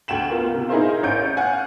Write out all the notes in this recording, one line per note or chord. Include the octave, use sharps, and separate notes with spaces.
D2 G5 E7 F#7
A#3 B3 F4
C3
D#4 E4 G#4 A#4 C5 F5
A1 G6 D7
F5 F#5 G#5